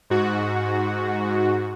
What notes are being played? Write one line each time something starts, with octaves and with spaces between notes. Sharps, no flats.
G#2 F#4